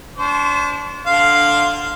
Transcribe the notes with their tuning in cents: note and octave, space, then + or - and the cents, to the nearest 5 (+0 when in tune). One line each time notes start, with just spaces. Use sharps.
D4 -30 C5 +0 C#6 +35
D3 +0 F5 +0 C6 +0